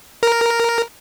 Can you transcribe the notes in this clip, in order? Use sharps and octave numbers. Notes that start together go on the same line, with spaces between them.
A#4